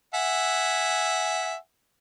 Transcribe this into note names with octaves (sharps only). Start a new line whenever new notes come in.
E5 F#5 G#5